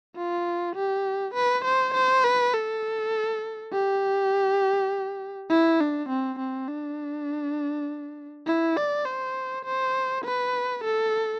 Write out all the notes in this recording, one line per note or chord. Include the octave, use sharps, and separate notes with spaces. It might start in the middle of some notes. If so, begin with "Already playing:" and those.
F4
G4
B4
C5
C5
B4
A4
G4
E4
D4
C4
C4
D4
E4
D5
C5
C5
B4
A4